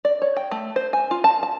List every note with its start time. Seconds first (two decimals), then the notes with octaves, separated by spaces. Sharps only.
0.05 D5
0.22 C#5
0.37 G5
0.51 A3
0.76 C5
0.93 G#5
1.11 F4
1.24 A5
1.43 A5